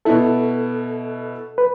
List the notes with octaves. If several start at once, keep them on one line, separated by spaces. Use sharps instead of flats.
B2 B3 E4 A4
B4